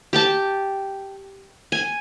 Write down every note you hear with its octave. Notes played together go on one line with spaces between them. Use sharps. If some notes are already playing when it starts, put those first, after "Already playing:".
G4 G5 A5
G#5